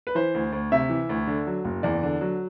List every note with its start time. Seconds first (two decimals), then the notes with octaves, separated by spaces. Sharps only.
0.07 B4
0.15 E3 C5
0.34 D2
0.52 D2
0.72 C3 E5
0.89 E3
1.09 D2
1.27 D3
1.47 F#3
1.65 F#1
1.83 E2 D5
2.03 D3
2.21 F#3